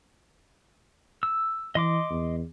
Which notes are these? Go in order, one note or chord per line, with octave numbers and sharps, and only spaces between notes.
E6
E3 D#5 C6 D6
E2